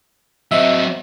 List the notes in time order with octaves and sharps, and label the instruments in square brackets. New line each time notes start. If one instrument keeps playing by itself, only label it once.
[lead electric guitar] F#3 C4 [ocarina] D#5 [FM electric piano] E5